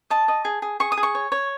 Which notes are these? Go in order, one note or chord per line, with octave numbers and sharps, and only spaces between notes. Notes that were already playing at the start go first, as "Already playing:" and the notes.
D#5 A5
D#5
G#4
G#4
G#4 C#6
D#6
G#4
C#6
C#5
C#5